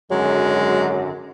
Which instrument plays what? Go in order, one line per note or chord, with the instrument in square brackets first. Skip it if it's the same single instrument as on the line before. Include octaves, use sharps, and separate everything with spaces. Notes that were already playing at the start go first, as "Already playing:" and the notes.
[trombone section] G#1 F#2 D3 [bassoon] F#3 [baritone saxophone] G#3